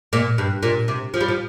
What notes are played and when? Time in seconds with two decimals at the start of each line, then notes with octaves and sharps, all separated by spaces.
0.13 A#2
0.38 G2
0.63 A#2
0.88 C3
1.14 F3
1.21 G3
1.29 F3